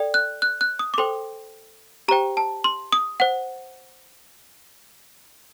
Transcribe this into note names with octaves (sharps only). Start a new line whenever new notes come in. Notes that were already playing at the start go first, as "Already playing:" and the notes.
Already playing: A4 D5 G5
F#6
F#6
F#6
D#6
D6
A4 C5 G5 C6
G4 C5 G5 A#5
A5
C6
D#6
C5 F#5